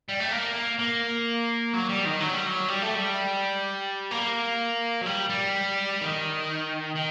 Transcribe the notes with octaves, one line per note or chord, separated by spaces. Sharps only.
G3
A3
A#3
A#3
F#3
G3
D#3
F#3
G3
F#3
G3
A3
G3
A#3
F#3
G3
G3
D#3
D#3